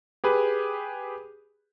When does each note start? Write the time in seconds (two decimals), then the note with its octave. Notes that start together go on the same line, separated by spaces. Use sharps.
0.24 G4 G#4 B4